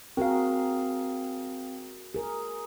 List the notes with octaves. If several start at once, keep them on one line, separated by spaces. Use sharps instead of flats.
C4 F#4 G#4 A#4 F5
G#4 A#4